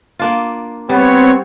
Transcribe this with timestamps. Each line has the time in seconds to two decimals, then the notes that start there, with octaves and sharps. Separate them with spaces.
0.19 A#3 D4 F4
0.89 G3 B3 C4 C#5